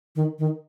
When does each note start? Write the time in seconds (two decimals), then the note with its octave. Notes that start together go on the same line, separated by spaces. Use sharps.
0.16 D#3
0.39 D#3